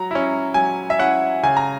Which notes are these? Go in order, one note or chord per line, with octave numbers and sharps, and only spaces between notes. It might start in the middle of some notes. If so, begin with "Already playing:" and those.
Already playing: F#3 A#5
C#4 E4
F#3 G#5
E5
C#4 E4 F#5
C#3 G#5
A#5